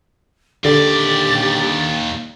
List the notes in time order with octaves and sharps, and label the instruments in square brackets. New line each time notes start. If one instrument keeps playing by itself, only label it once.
[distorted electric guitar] D#2 D5 [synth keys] D3 [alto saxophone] G4 [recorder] A6